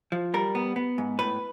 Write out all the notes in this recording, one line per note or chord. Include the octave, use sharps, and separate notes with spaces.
F3
G3 A#4
B3
B3
G#2
A2 B4